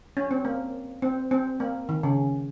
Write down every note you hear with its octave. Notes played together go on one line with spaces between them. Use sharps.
C#4
C4
A#3
C4
C4
A#3
D#3
C#3